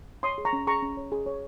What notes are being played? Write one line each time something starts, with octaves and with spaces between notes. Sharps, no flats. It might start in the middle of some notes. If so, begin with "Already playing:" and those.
C#5 C6 D#6
G#4
A#5 C#6
C#4
G#4 A#5 C#6
C#4
C#5
G#4
C#5